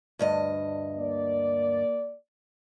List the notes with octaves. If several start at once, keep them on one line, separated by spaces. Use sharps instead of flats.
D2 G2 D#5
A#3 D5